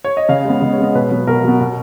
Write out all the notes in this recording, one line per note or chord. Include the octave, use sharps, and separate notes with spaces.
C#5
D#5
C#3 F5
G#3 B3
C#3 D#5
C#5
G#3 B3 D#5
B2 B4
F#3 B3
B2 A#4
F#3 B3 F#4
B2 F#4